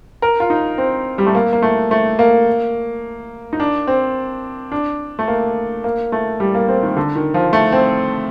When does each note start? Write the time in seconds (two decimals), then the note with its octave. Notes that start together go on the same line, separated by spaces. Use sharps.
0.22 A#4
0.40 F4
0.50 D#4
0.78 C4
1.18 G3
1.26 A3
1.35 A#3
1.53 A#3
1.62 A3
1.91 A3
2.19 A#3
3.53 D#4
3.60 D4
3.87 C4
4.72 D4
5.19 A3
5.28 A#3
5.84 A#3
6.12 A3
6.40 G3
6.55 A#3
6.69 C4
6.83 D#3
6.97 D3
7.16 D#3
7.34 F3
7.53 A3
7.72 C4